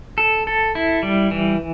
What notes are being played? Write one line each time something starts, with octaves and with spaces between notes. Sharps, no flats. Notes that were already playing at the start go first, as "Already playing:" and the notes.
A4
A4
E4
G3
E3